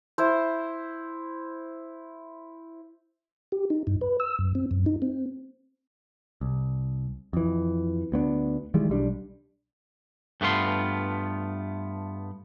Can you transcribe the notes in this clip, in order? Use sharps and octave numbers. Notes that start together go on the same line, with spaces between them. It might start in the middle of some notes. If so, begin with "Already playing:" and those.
E4 C5
G4
D#4
G2
B4
E6
F#2
C4
F#2
D#4
C4
C2
F2 E3
D2 B3 C4 D4
D#3 E3 G3 G#3
B1 G3 D4
G2 A3 B3 F4 C6